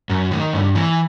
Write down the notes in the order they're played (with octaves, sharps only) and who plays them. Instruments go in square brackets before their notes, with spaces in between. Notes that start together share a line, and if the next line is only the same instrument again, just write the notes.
[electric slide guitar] F#2
D#3
G2
E3